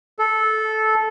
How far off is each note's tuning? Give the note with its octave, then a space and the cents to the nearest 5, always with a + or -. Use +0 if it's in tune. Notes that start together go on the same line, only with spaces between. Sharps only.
A4 -15